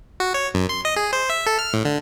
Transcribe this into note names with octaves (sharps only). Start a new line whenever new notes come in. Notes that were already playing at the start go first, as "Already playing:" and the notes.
F#4
C#5
F#2
C6
D#5
G#4
C5
E5
A4
F6
A2
D3